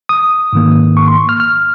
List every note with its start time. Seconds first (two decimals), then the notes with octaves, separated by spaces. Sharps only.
0.09 D#6
0.53 G#2 D#3 A#3
0.97 C#6
1.08 C6
1.18 C#6
1.29 F6
1.40 F6